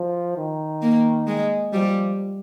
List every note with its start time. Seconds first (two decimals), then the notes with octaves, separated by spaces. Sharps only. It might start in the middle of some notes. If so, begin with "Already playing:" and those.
Already playing: F3
0.38 D#3
0.82 A#3
1.27 G#3
1.73 F3 G3